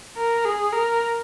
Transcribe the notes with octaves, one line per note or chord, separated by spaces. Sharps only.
A#4
G#4
A#4